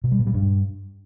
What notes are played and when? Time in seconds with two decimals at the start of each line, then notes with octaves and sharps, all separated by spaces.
0.04 B2
0.11 G3
0.19 A#2
0.27 G3
0.34 G2